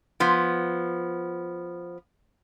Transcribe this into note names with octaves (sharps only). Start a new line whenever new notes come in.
F3 B3